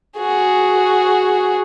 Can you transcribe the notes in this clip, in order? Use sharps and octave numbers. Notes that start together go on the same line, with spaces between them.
F#4 G#4